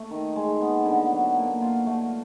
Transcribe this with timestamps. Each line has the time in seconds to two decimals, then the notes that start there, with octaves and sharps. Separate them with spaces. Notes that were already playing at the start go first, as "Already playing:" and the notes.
Already playing: A3
0.11 D#3
0.36 G#3
0.61 B3
0.86 D3
1.11 F#3
1.36 A#3
1.62 F4
1.86 A3